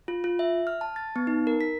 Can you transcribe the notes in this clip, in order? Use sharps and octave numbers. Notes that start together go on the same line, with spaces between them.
F4
F4
E5
F6
A5
A6
B3
D#4
A#4
B6